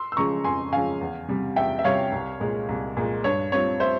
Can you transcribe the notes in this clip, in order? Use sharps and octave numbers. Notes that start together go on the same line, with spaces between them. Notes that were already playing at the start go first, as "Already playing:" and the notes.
Already playing: C6 E6
E6
C#3 F3 G#3 C#4 A#5 C#6
F2 G#5 C6
C#3 F3 G#3 C#4 F5 G#5
E2
C3 G3
E2 E5 G5
E5
C3 G3 C#5 F5
C2
A#2 G#3
C2
A#2 G#3
G2 C#5
G3 C4 F4 C#5
C5 E5